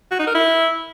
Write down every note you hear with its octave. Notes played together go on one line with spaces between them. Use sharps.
F#4
D#4
A#4
E4